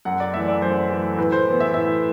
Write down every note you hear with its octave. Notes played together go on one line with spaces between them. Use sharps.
F#2 F#5
D5
E3 A3 E5
D5
F#2 C5
E3 A3
A2 B4
C5
E3 B3
E5
A2 E5